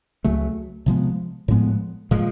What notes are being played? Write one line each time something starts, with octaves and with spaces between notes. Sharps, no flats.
C#2 C#3 F#3 A3
C3 F3 G#3 B3
A2 F3 G#3 B3
A#2 F3 G#3